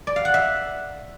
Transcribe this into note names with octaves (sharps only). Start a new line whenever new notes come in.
D5
F5
F#5
E5